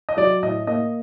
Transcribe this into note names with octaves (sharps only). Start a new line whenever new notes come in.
D#5
F#3 D5
A2 D#5
A#3 D#5